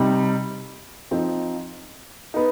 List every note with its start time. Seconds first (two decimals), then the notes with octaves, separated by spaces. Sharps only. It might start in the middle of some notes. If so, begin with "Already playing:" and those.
Already playing: C3 G3 C4 D#4
1.11 F3 C4 D#4
2.34 B3 D#4